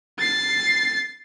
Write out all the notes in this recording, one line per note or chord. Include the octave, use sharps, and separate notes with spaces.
A6 C7